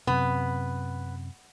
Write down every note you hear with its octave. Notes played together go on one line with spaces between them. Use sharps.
F#2 C3 B3